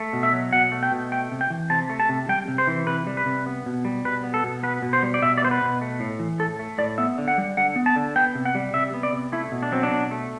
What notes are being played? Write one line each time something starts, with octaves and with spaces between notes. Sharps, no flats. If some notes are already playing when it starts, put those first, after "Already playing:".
Already playing: A3
B2
E5
F#3
B2 F#5
A3
G5
B2
A3 G5
C3
G5
E3
C3 A5
A3
A5
C3
G3 G5
C3
C5
E3
C3 B4
G3
B4
C3
B3
B2
G3
B2 B4
B3
A4
B2
B3 B4
B2
C5
G3
D5
B2 E5
D5
B3 C5
B4
B2
A3
A2
E3
A2 A4
A3
A2 D5
B3 E5
D3
F#5
G3
D3 F#5
B3
A5
D3
B3 G5
C3
F#5
G3
C3 E5
B3
D5
C3
A3 E4
B2
D4
F#3 C4
D4
B2
A3